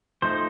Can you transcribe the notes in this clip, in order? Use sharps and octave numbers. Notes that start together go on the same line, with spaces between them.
F3 A3 D#4 C5